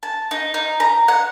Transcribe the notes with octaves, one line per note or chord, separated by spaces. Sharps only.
A5
D#4
D#4
A#5
F#5